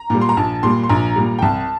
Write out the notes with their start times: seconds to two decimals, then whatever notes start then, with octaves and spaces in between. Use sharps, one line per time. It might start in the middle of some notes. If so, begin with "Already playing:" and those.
Already playing: A#5
0.10 A#2 G3
0.21 C6
0.29 A#5
0.37 A#1 A5
0.63 A#2 G3 C6
0.83 C6
0.89 A#1 A#5
1.16 A#2 G3
1.39 G5
1.42 C2 A5